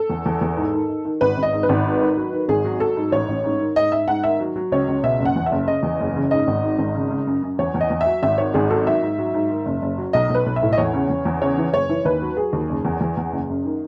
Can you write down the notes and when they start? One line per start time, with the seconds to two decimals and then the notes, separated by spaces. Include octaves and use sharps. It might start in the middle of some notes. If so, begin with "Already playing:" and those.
Already playing: A4
0.10 E2
0.26 E2
0.41 E2
0.57 G#2
0.73 D#3
0.89 D#3
1.05 D#3
1.21 G#1 B4
1.37 G#1
1.43 D#5
1.52 G#2
1.63 B4
1.69 G#1
1.85 G#2
2.01 D#3
2.17 F#3
2.32 D#3
2.48 G#1 G#4
2.65 F#3
2.80 F#3 A4
2.96 G#2
3.12 A1 C#5
3.29 A1
3.44 G#2
3.60 D#3
3.76 G#2 D#5
3.92 G#2 E5
4.08 G#2 F#5
4.23 D#3 E5
4.40 F#3
4.56 F#3
4.72 C#2 C#5
4.88 C#2
5.03 B2 E5
5.20 F#1
5.25 F#5
5.36 E2
5.46 E5
5.52 F#1
5.67 C#3 D#5
5.83 E2
6.00 F#1
6.16 C#3
6.31 G#2 D#5
6.47 G#1
6.63 G#2
6.78 G#1
6.95 C#3
7.11 C#3
7.27 F#2
7.43 F#2
7.59 E2 C#5
7.74 E2
7.81 D#5
7.90 E2
8.01 E5
8.06 F#3
8.23 G#1 E5
8.38 D#3 C#5
8.54 G#1 G#4
8.70 F#3 A4
8.86 D#3 E5
9.02 G#2
9.18 F#3
9.34 G#2
9.50 D#3
9.66 F#1
9.82 F#1
9.98 F#3
10.13 B1 D#5
10.30 B1
10.35 B4
10.46 B1
10.56 E5
10.62 A2
10.73 D#5
10.78 E2 C#5
10.93 C#3
11.10 E2
11.25 E2
11.41 C#3 C#5
11.58 E3
11.73 F#1 C#5
11.89 E3
12.05 D#2 B4
12.22 F#3
12.37 F#3 G#4
12.53 D#2
12.70 F#1
12.85 E2
13.01 E2
13.17 E2
13.32 F#1
13.49 F#2
13.65 D#3